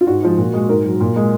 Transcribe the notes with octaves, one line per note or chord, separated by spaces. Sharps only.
F4
G#2 F#4
F3 G#3
A#2
G#3
G#2 A#4
F#3
A#2
G#3